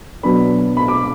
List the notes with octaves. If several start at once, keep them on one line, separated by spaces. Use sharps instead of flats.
B2 F#3 B3 D4 B5
B5
D6